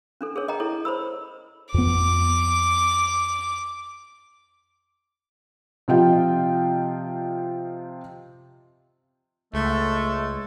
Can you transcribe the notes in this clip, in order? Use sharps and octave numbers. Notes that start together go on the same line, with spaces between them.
C#4 D4 A4
G#4 A#4 C#5
D#5 G5 A#5
E4 A4 C#5
C5 C#5 B5 E6
F2 B3 D6
C3 F3 F4 D#5 G5
C#2 G#3 A3 A4